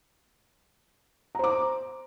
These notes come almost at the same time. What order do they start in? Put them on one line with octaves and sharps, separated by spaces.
A#5 C5 D6